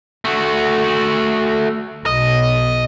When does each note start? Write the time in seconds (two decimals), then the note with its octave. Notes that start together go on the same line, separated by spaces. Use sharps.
0.25 A3 F#4
2.06 B1 D#5